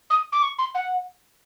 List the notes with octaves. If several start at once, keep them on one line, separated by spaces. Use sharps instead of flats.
D#6
D6
C#6
C6
F#5